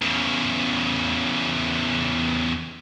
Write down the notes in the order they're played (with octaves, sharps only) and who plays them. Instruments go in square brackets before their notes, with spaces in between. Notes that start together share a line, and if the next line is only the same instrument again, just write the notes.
[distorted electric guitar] E2 C#3